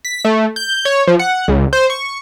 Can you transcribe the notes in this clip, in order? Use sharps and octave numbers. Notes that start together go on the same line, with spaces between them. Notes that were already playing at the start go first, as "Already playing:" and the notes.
B6
A3
G6
C#5
F3
F#5
C#2
C5
C#6